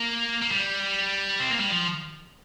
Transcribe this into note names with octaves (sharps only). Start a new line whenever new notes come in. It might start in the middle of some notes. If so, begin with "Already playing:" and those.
Already playing: A#3
A#3
G3
C4
A#3
G3
F3